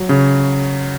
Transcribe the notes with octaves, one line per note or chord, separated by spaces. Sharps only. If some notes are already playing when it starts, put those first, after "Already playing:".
Already playing: F#3
C#3